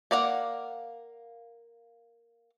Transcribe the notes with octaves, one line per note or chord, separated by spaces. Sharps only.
A#3 D5 F5 F#5